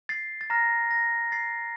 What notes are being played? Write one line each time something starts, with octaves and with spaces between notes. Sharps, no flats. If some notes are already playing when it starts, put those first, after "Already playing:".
A6 C7
A6
A#5 F6 A#6
A#6
A6 C7